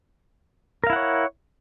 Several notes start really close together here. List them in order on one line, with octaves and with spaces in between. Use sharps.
A#4 F5 E4 F#5 C#5